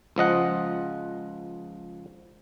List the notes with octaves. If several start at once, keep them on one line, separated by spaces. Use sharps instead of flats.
C#2 F3 D#5 F#5